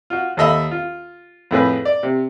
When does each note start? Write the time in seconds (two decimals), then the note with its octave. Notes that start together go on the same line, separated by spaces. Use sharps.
0.10 F4 F#4
0.37 D#2 A4 D#5 E5 B5
0.71 F4
1.51 F2 A2 G#4 B4
1.85 D5
2.03 C3